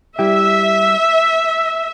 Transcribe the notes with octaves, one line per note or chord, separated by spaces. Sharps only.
G3 E4 G4 E5